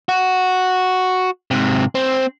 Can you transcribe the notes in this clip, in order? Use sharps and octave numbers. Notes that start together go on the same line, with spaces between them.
F#4
G#2 C3
C4